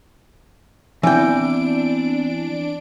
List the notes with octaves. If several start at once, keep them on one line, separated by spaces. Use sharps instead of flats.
E3 B3 C4 D4 E4 G5 D7